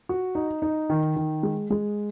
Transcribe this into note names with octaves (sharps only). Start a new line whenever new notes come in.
F#4
D#4
D#4
D#3
D#3
G#3
G#3